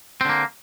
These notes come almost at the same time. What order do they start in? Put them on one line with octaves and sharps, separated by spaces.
C4 D3 A#3